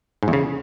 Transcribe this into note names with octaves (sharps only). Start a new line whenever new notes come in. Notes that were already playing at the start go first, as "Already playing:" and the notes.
G#2
E2
C#3